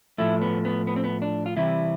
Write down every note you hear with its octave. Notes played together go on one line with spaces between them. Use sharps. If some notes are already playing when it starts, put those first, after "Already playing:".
A2 F3 A3 E4
B3
B3
B3
C4
B3
D4
F4
C3 E3 G3 E4